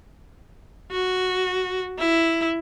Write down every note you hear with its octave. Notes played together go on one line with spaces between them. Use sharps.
F#4
E4